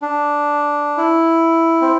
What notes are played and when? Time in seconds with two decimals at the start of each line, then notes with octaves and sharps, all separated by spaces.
0.02 D4
0.97 E4
1.82 C4